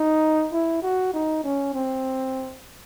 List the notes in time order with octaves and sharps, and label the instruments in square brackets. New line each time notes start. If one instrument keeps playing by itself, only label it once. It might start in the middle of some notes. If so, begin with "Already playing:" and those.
Already playing: [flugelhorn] D#4
E4
F#4
D#4
C#4
C4